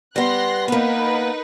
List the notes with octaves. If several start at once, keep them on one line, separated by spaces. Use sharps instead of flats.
G3 B3 C6 F#6 A#6
A#3 B3 D#4 A#4 B4